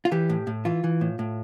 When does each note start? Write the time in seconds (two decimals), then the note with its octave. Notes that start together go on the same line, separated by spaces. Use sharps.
0.05 F4
0.12 E3 G4
0.30 A2
0.47 A2
0.65 E3 F4
0.84 E3
1.01 A2
1.19 A2